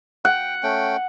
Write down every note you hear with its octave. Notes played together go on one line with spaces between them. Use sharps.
F#5 G5
A3 C#4 G5